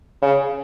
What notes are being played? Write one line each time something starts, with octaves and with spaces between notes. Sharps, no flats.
C#3